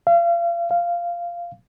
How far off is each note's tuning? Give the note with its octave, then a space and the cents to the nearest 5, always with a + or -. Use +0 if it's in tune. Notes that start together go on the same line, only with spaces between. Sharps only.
F5 -35
F5 -10